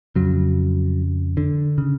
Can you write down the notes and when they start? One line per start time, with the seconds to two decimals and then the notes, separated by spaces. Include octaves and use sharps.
0.15 F2 C#3 F#3
1.37 D3
1.78 C#3